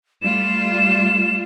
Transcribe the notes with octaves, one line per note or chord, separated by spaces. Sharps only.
G3 A3 F4 E7